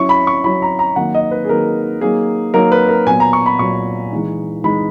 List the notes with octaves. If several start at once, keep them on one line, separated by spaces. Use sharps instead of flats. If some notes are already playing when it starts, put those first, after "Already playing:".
Already playing: F#3 C#4 E4 C#6
B5
C#6
F#3 C#4 E4 B5
A#5
A#5
D#3 F#3 A#3 D#4 F#5
D#5
B4
G#4
D#3 F#3 A#3 D#4 A#4
F#3 A#3 D#4 G#4
F#3 A#3 D#4 A#4
B4
A#4
A#2 F#3 B3 G#5
A#5
C#6
B5
A#2 F#3 B3 C#6
E3 G#3 D#4
E3 G#3 D#4 B5